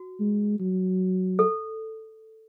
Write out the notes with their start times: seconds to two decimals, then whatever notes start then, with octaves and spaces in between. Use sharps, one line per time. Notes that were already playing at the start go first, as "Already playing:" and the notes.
Already playing: F#4
0.20 G#3
0.59 F#3
1.39 A4